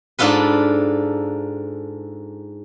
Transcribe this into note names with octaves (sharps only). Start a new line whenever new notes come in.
G#2 D4 F4 A4 B4